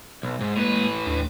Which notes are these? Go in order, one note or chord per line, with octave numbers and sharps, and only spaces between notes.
B1
G#2
A2 G#3 A#3 B4
D#2 D4